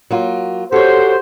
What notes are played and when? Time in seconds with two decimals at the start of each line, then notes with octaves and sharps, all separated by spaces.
0.11 F#3 A#3 F4
0.72 F#4 G4 A4 C5 C#5